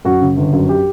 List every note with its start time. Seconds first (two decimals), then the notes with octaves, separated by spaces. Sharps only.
0.05 F#2 F#4
0.21 C#3
0.37 G1
0.53 F#2
0.69 G4